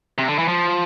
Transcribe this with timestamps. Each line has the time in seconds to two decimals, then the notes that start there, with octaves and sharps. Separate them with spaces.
0.18 C3
0.28 D3
0.38 E3
0.48 F3